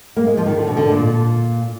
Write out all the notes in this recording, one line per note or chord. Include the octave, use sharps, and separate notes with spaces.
A#3
G#3
F3
D#3
D3
B2
D3
A#2